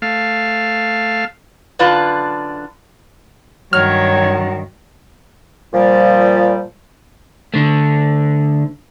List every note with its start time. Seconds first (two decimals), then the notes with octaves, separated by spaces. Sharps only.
0.02 A3 F5
1.79 F#2 D3 D4 F4 B4
3.73 G2 D#3 F#3 C#5 F6
5.73 A#2 F3 G3
7.54 D3 A3